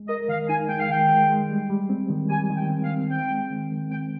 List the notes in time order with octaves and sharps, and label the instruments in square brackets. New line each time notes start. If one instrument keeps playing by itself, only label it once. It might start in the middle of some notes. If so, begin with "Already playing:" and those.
Already playing: [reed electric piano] G#3
[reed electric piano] A#4 [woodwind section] D#5
[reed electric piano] D#3 [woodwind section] F5
[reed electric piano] D#4 [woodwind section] G#5
[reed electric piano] G#3 [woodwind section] G5
[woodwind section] F5
[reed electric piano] D#3 [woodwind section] G5
[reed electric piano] G#3
G#3
G3
G3
C4
D#3
[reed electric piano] G3 [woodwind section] G#5
[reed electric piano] D#3
[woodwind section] G5
[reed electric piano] C4
[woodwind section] F5
[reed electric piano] C4
[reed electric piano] C4 [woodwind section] G5
[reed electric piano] G#3
D#3
D#3
[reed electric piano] C4 [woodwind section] G5